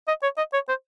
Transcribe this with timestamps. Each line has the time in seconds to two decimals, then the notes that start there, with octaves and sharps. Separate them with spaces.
0.08 D#5
0.23 C#5
0.38 D#5
0.54 C#5
0.69 C5